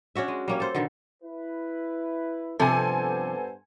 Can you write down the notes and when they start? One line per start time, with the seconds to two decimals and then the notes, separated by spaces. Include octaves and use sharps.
0.16 C#4 D4 F#4 E5
0.28 G#3
0.48 G3 A#3 C#4
0.60 A4 C5
0.75 B2 D3 D#3
1.22 E4 B4
2.59 G2 C3 F3 B3 A4 C5 G#5